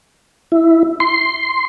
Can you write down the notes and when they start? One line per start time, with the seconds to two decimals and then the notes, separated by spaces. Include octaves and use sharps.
0.52 E4
1.00 C6